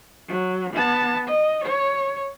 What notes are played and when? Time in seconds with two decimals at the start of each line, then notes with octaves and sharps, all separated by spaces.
0.28 F#3
0.73 B3 A5
1.28 D#5
1.64 C#5